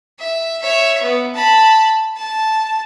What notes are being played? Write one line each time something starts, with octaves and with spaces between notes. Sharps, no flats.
E5
C#5 E5
B3
A5 B5
A5